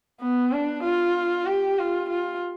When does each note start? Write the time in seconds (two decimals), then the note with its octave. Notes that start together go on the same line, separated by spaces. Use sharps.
0.21 B3
0.52 D4
0.84 F4
1.46 G4
1.79 F4
2.10 F4